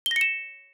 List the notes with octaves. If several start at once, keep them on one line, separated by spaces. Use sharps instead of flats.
G7
A#6
C#7
E7